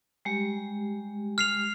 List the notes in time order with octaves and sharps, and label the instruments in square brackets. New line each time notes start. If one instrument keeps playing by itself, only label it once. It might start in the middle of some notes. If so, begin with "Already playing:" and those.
[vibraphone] G3 G#3 G4
[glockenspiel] F6 C7 F7